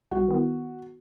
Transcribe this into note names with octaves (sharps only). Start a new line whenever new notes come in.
B1 G3 F#4
D#3 B3 E4